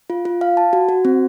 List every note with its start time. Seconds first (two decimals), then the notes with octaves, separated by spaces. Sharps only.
0.10 F4
0.25 F4
0.41 F5
0.57 A5
0.73 F#4
0.89 F#4
1.05 C4